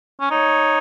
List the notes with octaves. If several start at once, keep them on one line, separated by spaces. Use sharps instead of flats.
C#4
D#4 C#5